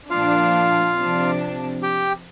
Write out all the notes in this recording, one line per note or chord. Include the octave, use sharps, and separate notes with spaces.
A#2 F3 D4 F4 F5
C3 F3 D4
G4 G5